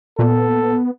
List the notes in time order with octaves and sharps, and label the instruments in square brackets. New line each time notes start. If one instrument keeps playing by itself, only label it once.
[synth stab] A#2 [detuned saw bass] B3 [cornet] A4